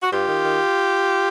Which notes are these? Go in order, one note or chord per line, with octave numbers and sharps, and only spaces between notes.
F#4
G2 F4 G4
D#3
D#3